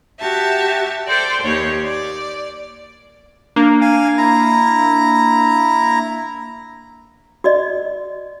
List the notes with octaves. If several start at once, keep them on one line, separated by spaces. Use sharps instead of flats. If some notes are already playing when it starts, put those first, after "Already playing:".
F#4 G4 E5 A5
A4 C5 D5 G5
D#2 C#5
D5
A#3 D4
F5 G#5
E4 A#5
F#4 D5 D#5